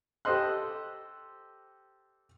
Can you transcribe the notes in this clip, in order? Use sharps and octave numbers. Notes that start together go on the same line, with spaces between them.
G4 A4 C5 D#5 C6 F#6